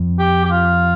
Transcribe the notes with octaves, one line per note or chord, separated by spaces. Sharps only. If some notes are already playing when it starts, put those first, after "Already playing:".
Already playing: F2
G4
G4
F4